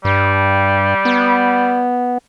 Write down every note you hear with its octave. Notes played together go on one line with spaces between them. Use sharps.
G2 G3
B3